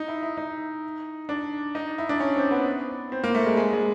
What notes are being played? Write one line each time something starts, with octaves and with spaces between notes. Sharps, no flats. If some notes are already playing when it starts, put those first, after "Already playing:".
Already playing: D#4
E4
E4
D#4
D4
D#4
E4
D4
C#4
C4
B3
C4
A#3
A3
G#3
G#3
G#3